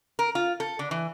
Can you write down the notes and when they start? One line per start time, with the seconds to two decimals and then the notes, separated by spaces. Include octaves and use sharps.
0.19 A#4
0.35 F4
0.60 A4
0.79 D3
0.91 E3